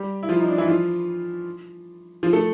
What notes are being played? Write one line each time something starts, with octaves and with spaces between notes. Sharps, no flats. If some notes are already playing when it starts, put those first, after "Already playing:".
Already playing: G3 G4
E4
F3 F4
D#4
D4
E3 E4
F3 F4
F3 F4
A3 A4